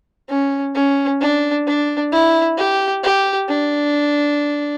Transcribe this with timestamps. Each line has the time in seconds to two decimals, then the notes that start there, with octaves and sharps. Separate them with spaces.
0.29 C#4
0.75 C#4
1.21 D4
1.67 D4
2.12 E4
2.58 G4
3.03 G4
3.49 D4